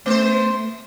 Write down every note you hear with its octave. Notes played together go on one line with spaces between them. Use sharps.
A3 B3 C5